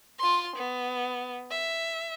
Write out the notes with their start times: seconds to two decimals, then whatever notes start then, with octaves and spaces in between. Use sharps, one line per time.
0.19 F4 C6
0.56 B3
1.51 E5